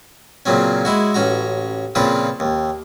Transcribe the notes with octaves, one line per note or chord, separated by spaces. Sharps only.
A#2 C#3 F#3 C4 C#4
G#3 E4 F#4
A1 C#4 F#4 A#5
A#2 C#3 F3 C4 F4 B4
D#2